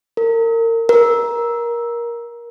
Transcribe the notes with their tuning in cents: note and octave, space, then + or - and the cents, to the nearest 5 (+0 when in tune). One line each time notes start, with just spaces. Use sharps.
A#4 -30
A#4 +20